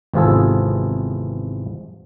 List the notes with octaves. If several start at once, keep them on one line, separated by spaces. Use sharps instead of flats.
G#1 E2 C3 F4 G#4 A4